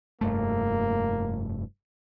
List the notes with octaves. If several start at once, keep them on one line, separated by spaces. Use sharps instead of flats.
F1 G2 A3 A#3